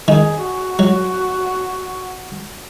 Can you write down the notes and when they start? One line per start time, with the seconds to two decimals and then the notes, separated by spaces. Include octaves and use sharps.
0.08 D#3 G#4
0.43 F#4
0.79 F#3